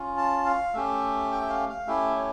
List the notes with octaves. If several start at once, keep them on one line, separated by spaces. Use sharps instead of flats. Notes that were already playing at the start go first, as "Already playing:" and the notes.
Already playing: C#4 F4
A5
F5
A3 C#4 G4 E5
G5
E5
F5
F5
A3 C#4 E4 G4 E5
C#5